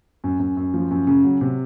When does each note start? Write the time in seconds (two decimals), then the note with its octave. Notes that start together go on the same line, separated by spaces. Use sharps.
0.24 F#2
0.40 F#2
0.57 F#2
0.74 F3
0.91 F#2
1.07 C#3
1.24 F#3
1.41 C3